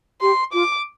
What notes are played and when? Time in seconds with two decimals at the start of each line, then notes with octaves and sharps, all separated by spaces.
0.22 G4 C6
0.53 F4 D6